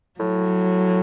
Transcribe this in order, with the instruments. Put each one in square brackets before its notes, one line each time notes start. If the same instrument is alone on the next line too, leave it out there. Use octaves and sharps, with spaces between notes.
[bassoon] A2 [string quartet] F#3